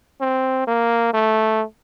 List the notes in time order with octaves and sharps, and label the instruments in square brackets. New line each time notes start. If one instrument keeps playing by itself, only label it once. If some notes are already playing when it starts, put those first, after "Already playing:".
[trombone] C4
A#3
A3